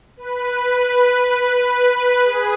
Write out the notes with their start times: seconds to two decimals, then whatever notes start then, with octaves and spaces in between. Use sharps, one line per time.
0.17 B4
0.51 B4
1.56 B4
1.90 B4
2.24 G#4